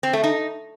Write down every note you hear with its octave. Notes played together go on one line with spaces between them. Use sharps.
C4
A3
D#4